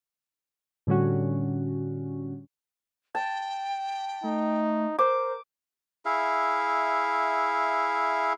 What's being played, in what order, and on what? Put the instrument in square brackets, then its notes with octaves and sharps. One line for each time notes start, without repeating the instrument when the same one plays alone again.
[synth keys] A2 D3 G3 C#4 F#4
[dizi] G5 [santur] A5
[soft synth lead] A3 [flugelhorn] D#4
[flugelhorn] A#4 [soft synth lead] C5 [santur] D6
[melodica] E4 G#4 E5 F5